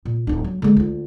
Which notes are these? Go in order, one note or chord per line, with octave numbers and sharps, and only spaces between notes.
A#2
D1 D4
F#3
D3 G#3
D2 F4